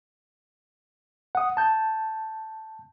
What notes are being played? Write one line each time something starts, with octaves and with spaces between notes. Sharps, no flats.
F#5 D#6
A5 G6